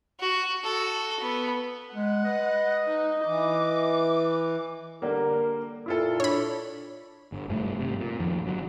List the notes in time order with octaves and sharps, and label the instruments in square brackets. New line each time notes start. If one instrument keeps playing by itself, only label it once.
[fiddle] F#4
F#4 A4
B3
[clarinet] G#3 [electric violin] F#5
[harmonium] B4 [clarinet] D#5
[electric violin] D#4
[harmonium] E3 [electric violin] D6
[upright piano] D3 G3 A#3 [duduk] A#4
[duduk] A#2 [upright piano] E4 F4 A4
[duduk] D4 [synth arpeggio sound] C#5 B5
[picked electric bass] G1
F1 G2 A3
G#1 C3
A#2
F2 D#3
G1 F#3